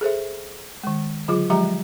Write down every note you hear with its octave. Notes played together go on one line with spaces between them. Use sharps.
G#4 A4 C5 E5
D#3 G#3
D3 F#3 F4 G#4 D6
F3 F#3 G#3 G4 E5 A#5